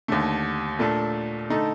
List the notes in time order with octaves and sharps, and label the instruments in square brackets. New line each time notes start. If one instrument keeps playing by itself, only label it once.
[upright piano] D#2 D3 A3
A#2 A3 D4 A4
D3 A3 D#4 A4